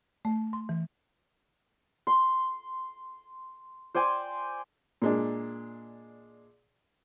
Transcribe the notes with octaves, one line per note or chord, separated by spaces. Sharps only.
A3
C6
E3
C6
C5 D5 G5 G#5
A#2 G#3 D4